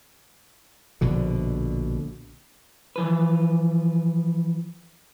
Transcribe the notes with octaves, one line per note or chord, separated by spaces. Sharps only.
A#1 B2 D3
E3 F3 B4